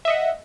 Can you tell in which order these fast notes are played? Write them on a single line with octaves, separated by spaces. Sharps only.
E5 D#5 F#5